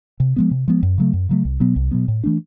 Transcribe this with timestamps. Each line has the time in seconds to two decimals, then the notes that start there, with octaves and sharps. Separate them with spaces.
0.20 C3
0.36 F3 G#3 B3
0.51 C3
0.68 F3 G#3 B3
0.83 F#2
0.98 C#3 F#3 A3
1.13 F#2
1.29 C#3 F#3 A3
1.45 C2
1.60 B2 F#3 B3
1.76 C2
1.91 B2 F#3 B3
2.08 A2
2.24 E3 A3 D4